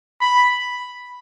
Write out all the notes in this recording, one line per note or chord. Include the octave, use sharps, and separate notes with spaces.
B5